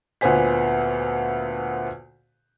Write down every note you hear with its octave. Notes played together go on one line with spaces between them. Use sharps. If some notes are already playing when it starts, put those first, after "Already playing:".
D2 A#2 B3 C5 G#5 B6